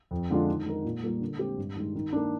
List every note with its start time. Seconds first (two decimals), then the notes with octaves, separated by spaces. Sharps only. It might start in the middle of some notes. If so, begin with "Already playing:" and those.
0.11 F2
0.30 D3 G#3 D4 F4
0.49 D#3
0.66 G#3 D#4 A#4
0.85 A#2
1.03 G3 A#3 F4 A#4
1.21 D3
1.39 G#3 C4 G4
1.58 G2
1.76 D#3 G#3
1.95 D#3
2.12 A#3 D4